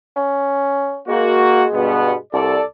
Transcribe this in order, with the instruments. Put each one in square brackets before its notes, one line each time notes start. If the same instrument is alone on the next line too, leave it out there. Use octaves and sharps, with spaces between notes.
[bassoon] C#4
[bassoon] G#3 [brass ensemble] A#3 F#4
[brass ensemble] G2 B2 B3
[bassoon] C2 [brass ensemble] A4 D5